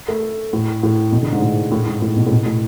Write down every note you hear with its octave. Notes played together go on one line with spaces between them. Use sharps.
A3
A2
A2
B2
D3
G#2
A2
A2
G#2
A2
B2
A2
B2
A2